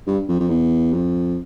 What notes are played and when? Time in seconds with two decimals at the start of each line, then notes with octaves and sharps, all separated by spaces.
0.07 G2
0.29 F2
0.40 F2
0.49 E2
0.93 F2